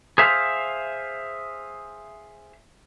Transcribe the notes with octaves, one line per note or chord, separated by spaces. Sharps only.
G#4 C5 E5 F5